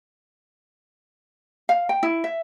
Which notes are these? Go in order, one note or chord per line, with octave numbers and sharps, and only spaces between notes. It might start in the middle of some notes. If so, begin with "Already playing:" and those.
F5
G5
E4
E5